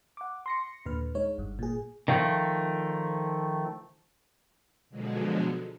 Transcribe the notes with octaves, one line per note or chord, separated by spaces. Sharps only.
F#5 D6
C6 A#6 C#7
D#2 A#2 D3 B4 F6
G#3 D#4 C#5
G1 G2
A#2 G#4
D#3 F3 A3
B2 D3 F3 F#3 G#3